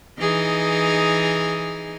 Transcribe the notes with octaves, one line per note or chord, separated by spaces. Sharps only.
E3 D#4 G#4